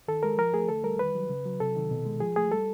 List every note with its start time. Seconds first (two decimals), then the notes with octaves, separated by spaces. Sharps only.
0.08 D#3 A4
0.23 G#3 A#4
0.38 F3 A#4
0.54 A3 G#4
0.69 D3 A4
0.84 G3 A#4
0.99 D#3 B4
1.15 F#3
1.29 C#3
1.46 F#3
1.60 C3 A4
1.76 D#3
1.91 B2
2.06 G#3
2.20 F3 G#4
2.36 A3 G#4
2.51 G3 A4